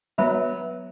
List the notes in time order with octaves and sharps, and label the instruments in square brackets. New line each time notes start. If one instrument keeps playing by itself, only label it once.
[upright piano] F#3 B3 [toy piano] B4 E5 B5